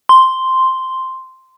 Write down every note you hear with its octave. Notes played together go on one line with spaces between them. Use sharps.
C6